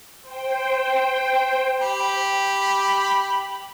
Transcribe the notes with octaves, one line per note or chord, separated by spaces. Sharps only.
C5 G5
G4 B5